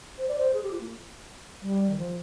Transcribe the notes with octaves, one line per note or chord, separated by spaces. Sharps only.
C5
D5
C5
G#4
G4
F4
A#3
G3
D#3
F3